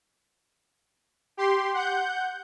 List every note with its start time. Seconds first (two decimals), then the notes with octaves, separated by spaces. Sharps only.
1.37 G4 C6
1.74 F#5 G6